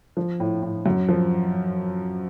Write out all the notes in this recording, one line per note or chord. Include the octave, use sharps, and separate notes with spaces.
F3
A2
A2
F#2
F3